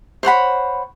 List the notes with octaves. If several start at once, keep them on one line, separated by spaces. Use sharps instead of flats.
C5 C#5 F#5 B5